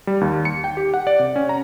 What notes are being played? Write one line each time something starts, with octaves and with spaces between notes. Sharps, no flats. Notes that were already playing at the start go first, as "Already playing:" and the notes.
G3
D#2
C#7
G5
G4
F#5
D5
C3
C#4
A#5